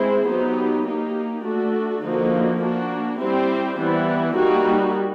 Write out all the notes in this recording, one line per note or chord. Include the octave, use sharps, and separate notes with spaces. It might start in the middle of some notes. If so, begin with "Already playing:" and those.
Already playing: G#3 C4 E4 G#4 C5
F#3 B3 D#4 G4
A#3 D#4 G4
A3 D4 F#4 A4
D3 F3 A#3 D#4 F#4
A#3 D4 F#4
G3 C4 E4 G4 C5
E3 G3 B3 E4
G3 A#3 D#4 F#4